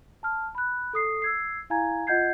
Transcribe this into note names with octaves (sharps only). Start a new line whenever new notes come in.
A5 F6
B5 F#6
A4 D#6 C7
E6 G#6 C7
E4 F5 G#5 A#5 G#6
F4 D#5 F#5 G6 G#6 C7